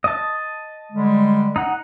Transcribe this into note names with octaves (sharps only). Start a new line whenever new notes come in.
D#5 A5
D3 G3 G#3
D#4 F#5